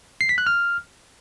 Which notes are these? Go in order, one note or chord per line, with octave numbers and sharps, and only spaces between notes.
C7
B6
F#6
F6